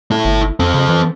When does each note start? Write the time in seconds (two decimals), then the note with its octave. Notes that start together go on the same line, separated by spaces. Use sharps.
0.11 E4 A4
0.25 G1
0.60 F2 C4 A4
0.74 C#3
0.89 E3